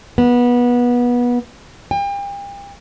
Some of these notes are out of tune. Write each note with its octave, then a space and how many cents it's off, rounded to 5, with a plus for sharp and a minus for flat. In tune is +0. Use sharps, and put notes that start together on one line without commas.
B3 -25
G5 +40